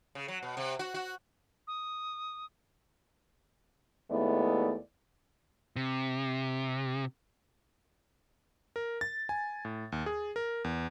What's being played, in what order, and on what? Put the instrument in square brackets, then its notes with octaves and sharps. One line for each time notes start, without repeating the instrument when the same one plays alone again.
[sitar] C#3
F#3
B2
C3
F#4
F#4
[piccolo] D#6
[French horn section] D#2 G#3 A3 B3 E4 D5
[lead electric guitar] C3
[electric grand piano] A#4
A6
G#5
A2
D#2
G#4
A#4
E2